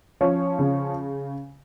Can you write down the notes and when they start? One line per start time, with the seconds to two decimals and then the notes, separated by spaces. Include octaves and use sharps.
0.21 F3 C#4 C#5
0.59 C#3